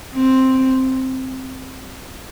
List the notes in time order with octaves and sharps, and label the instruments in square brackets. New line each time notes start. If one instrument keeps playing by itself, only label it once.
[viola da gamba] C4